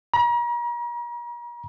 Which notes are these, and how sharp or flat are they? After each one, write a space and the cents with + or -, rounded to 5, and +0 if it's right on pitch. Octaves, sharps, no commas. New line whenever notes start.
A#5 +40